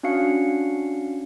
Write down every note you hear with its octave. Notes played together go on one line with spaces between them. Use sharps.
C#4 D4 F#4 F5 C#7